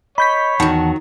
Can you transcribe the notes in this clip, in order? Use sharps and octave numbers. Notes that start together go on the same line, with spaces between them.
C#5 D#5 B5 G6 B6
E2 D#3 F#3 F#5 A5